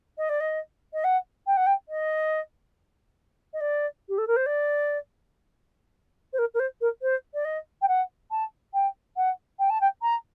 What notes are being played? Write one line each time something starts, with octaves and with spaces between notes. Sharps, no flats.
D#5
D5
D#5
D#5
F#5
G5
F#5
G5
D#5
D#5
D5
G4
A4
A#4
C5
D5
C5
A#4
A#4
C5
A#4
C5
D5
D#5
G5
F#5
A5
G5
F#5
G5
A5
G5
A#5